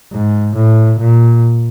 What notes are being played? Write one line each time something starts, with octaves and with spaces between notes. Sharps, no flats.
G#2
A2
A#2